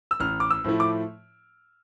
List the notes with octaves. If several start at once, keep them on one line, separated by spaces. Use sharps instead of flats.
E6
A1 F6
D6
E6
A2 F3 A3 E4
D6